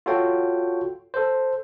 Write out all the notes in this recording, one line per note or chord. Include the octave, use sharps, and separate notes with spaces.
F4 F#4 A4 C#5 G5
A4 C5